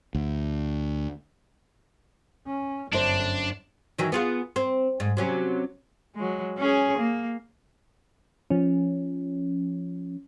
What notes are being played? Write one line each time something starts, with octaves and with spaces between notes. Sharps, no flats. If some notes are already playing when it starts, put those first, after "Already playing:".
D2
C#4
G1 F#2 D4 C5
D#3 E3 F#3
B3 F4 G#4
C4
G#2
C3 F#3 C#4
F#3 G#3
C#4 G#4
A#3
F3 C#4